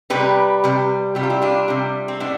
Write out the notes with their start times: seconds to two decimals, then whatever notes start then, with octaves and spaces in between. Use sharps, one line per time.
0.10 C3 G3 G4 B4
0.64 C3 G3
1.15 C3 G3 G4
1.23 F4
1.30 E4 G4
1.41 D4 F4
1.68 C3 G3
2.08 C4
2.20 A2 B3 D4